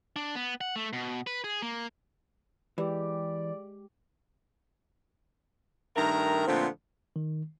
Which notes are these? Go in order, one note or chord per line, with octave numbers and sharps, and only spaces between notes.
D4
B3
F#5
A3
B2
B4
G#4
A#3
E3 G#3 G4 D5
G2 D#3 A3 A#4 A#5
A#2 D3 F3 A3 B3 C4
D#3